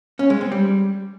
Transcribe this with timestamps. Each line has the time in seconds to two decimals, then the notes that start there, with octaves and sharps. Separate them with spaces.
0.19 C#4
0.30 G#3
0.41 C4
0.52 G3